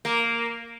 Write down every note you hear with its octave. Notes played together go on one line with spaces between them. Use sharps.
A#3